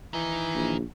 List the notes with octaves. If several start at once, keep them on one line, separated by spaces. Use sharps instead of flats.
D#3 E3
A#1